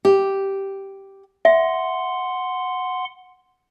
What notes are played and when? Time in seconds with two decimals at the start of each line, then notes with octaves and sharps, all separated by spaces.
0.05 G4
1.45 E5 F#5 C6